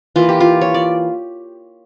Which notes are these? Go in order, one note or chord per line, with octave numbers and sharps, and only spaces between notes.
E3 A#3 F4
G4
F4
C#5
D5